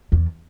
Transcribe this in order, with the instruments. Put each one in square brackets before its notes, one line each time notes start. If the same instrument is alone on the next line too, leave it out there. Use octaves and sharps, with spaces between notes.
[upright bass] E2